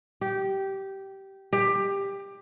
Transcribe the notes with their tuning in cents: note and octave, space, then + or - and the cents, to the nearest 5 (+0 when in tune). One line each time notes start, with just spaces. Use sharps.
G4 -15
G4 +15